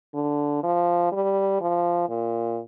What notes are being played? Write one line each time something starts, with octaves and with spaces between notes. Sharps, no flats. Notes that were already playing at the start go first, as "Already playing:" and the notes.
D3
F3
G3
F3
A#2